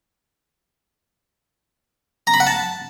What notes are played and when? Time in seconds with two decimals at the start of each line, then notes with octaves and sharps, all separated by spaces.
2.27 A#5
2.34 B5
2.40 F#5
2.47 A5